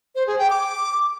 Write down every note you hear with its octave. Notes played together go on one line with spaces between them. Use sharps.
C5
G#4
G5
D6